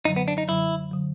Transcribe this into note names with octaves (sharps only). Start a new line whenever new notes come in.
F#2 D3 F#3 D#4
B3
D4
D#4
F#2 D3 F#3 E4
D3 F#3